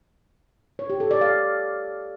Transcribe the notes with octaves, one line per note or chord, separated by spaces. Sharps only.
C#5
G4
A4
D5
F5